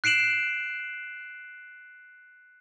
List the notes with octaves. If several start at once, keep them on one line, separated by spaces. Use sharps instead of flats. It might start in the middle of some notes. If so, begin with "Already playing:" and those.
F#6 C7 D7 E7 F#7